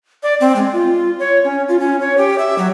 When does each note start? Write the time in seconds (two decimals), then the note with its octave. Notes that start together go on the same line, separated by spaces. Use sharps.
0.23 D5
0.40 C4
0.56 G#3
0.73 F4
1.19 C#5
1.44 C#4
1.68 F4
1.79 C#4
2.01 C#5
2.18 G4
2.38 E5
2.58 F#3